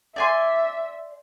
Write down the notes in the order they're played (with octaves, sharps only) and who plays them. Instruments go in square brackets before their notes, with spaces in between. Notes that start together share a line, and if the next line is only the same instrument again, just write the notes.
[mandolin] D5 G#5 C6 [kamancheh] E5